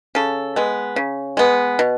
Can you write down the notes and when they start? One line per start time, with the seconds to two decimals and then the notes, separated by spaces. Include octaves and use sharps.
0.15 C#3 A4
0.56 G#3 B3
0.96 C#3
1.37 G#3 B3
1.79 B2